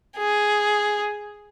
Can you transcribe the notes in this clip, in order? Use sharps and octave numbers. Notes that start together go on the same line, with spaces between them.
G#4